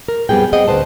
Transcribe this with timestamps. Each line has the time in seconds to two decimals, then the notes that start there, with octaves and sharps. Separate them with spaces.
0.08 A#4
0.29 F2 F3 G3 B3 G#4 G5
0.53 C4 G#4 D#5 F#5 G5
0.68 D2 D#3 B4 C5 A5